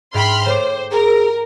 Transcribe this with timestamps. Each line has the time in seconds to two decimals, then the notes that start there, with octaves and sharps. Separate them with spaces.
0.14 G#2 E5 G5 B5 C6 F6
0.46 A3 C5 C#5 D6
0.91 G#4 A#4